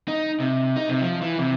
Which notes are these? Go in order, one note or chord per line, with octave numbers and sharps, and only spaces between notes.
D#4
C3
D#4
C3
F3
E3
C3